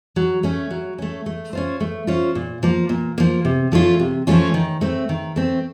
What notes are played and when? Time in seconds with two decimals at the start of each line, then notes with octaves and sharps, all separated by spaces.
0.16 F#3
0.43 A3 C#4
0.71 F#3
0.98 A3 C#4
1.26 A3
1.53 C#4 F4 C5
1.81 A3
2.07 C#4 F4 C5
2.35 A#2
2.63 F3 A#3
2.89 A#2
3.18 F3 A#3
3.45 C3
3.72 F3 A3 C#4 F4
3.99 C3
4.27 F3 A3 C#4 F4
4.54 D#3
4.81 A3 C4
5.09 D#3
5.36 A3 C4